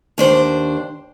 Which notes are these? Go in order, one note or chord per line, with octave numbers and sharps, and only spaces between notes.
D#2 D4 C5